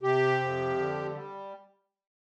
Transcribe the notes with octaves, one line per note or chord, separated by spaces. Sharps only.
C3 G4
F2
D3
G3